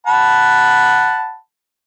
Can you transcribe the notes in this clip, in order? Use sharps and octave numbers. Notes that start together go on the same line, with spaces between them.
F#5 A5 B5